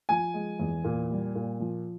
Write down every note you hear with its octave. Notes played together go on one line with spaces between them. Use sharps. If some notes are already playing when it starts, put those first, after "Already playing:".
F3 G#5
G#3
E2
A#2
G3
A#2
F3